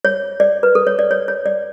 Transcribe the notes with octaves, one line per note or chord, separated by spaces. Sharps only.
C#5
D5
B4
A4
C#5
D5
C#5
C#5
D5